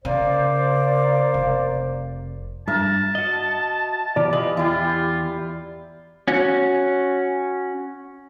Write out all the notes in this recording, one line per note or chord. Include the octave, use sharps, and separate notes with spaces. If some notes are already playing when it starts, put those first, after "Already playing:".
C#3 A#3 C5 D5
F1
G2 A#4 E5 A5
F#4 D#5
B2 E3 G4 A#4 D5
F4 G4 B4 D#5 G#5
E2 E4 F4 G4
C#4 F#4